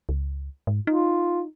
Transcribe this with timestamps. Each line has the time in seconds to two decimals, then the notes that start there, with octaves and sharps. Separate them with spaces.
0.09 C#2
0.67 G#2
0.87 D#4 F4